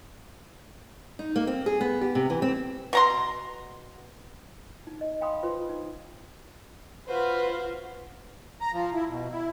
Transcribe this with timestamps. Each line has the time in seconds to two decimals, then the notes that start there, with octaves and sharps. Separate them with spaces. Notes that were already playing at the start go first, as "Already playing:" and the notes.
1.19 D#4
1.36 A#3
1.47 C4
1.66 G#4
1.81 B3
2.01 G4
2.15 C3
2.30 E3
2.42 C4
2.93 B2 A#5 C6
4.87 D#4
5.01 D#5
5.21 F5 G5 G#5 B5 C6 D#6
5.43 F4 B4 C5 C6
5.69 D#4
7.08 F4 F#4 B4 C5
8.61 A#5
8.73 F3
8.94 E4
9.09 B2
9.31 E4